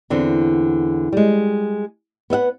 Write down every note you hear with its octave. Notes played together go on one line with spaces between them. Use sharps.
E2 D3 C4
G3 G#3
B3 B4 E5 F#5